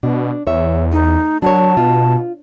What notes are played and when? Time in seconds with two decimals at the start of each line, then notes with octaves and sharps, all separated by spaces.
0.03 B2 D4
0.47 E2 C#5 E5
0.92 A3 D#4
1.42 F#3 D4 A#4 C#5 A5
1.77 B2 F4